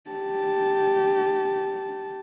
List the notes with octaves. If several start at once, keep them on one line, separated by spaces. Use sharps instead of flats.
G4 A5